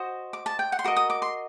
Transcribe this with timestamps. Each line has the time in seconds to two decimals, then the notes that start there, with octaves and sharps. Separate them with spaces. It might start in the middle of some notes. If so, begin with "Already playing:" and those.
Already playing: F#4 C5 D#5
0.33 D6
0.46 A5
0.59 G5
0.72 F#5
0.79 C6
0.84 F#4 A#4 D#5 D6
0.96 D#6
1.10 D6
1.22 C6